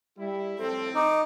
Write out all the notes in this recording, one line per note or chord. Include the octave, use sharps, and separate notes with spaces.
G3 E4
A2 F3 C4 A4
D#4 D6